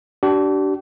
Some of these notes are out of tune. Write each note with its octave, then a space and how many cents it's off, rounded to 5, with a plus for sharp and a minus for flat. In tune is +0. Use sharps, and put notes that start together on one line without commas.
D4 -10 G4 -40